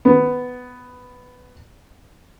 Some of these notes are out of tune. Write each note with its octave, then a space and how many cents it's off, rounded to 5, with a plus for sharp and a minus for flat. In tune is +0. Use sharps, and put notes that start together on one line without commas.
B3 +10